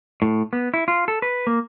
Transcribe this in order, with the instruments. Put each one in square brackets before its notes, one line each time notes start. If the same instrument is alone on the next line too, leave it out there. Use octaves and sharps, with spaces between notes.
[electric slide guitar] A2
B3
E4
F4
A4
B4
A#3